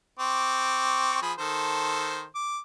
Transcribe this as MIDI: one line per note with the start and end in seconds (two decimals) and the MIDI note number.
0.19 1.21 60
0.19 1.21 85
0.19 1.21 86
1.22 1.33 53
1.22 1.33 68
1.22 1.33 83
1.39 2.25 51
1.39 2.25 69
1.39 2.25 72
2.35 2.59 86